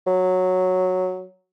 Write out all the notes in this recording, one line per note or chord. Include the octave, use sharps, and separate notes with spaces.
F#3